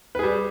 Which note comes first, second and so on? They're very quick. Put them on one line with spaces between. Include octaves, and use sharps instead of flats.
B4 G#4 G3